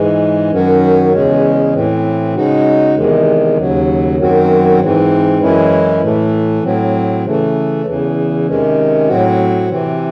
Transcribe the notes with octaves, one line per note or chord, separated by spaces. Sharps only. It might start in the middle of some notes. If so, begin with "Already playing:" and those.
Already playing: G#2 E3 G#3
F#2 D#3 F#3 C#4 F#4
E2 C#3 G#3 C#4
A2 E3 C4
C#3 G#3 D#4 F#4
E2 C3 D#3 G#3
D#2 C#3 F#3
F#2 D#3 F#3 C4 F#4
G#2 E3 C4
F#2 E3 G#3 C#4 E4
A2 E3 A3
A2 F#3 C4
C#3 E3 A3
E2 C#3 E3
C3 D#3 G#3 C#4
A2 F#3 C4 F#4
C3 E3 C4